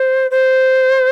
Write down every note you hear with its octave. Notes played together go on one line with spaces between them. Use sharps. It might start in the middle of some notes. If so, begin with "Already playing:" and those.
Already playing: C5
C5